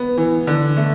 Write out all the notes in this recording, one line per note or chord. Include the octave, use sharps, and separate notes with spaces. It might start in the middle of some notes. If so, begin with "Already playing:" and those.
Already playing: B3
E3
D3
A3